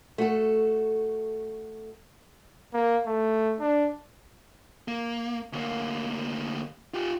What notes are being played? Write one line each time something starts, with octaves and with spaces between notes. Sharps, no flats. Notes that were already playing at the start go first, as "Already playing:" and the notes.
A3 F#4 A4
A#3
A3
D4
A#3
D2 A#3
F4 G4